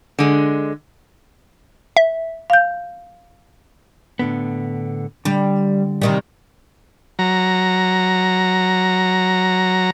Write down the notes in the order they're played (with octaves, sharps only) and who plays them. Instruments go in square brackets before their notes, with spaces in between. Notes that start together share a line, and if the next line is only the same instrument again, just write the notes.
[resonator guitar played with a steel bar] D3 G#3
[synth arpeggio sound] E5
[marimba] F5 G6
[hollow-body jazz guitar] A2 D3 B3
[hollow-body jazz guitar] D3 [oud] G3
[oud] C3 D#3 G3
[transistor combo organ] F#3 A#5